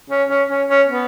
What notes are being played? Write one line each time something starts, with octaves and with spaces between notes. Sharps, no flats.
C#4
C#4
C#4
C#4
B3